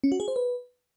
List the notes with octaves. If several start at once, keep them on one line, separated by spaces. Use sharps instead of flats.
C#4
F#4
G#4
C5
B4